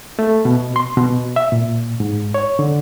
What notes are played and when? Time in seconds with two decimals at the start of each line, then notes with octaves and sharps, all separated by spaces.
0.19 A3
0.45 B2
0.76 C6
0.97 B2
1.36 E5
1.52 A#2
2.00 G#2
2.34 C#5
2.59 D3